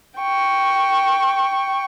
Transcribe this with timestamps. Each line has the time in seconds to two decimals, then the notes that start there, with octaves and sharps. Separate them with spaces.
0.20 G5 C#6